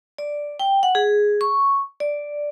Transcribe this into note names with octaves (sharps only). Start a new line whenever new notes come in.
D5
G5
F#5
G#4
C#6
D5